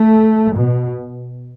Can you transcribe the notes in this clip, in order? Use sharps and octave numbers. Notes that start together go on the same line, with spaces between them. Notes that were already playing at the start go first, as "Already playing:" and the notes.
Already playing: A3
B2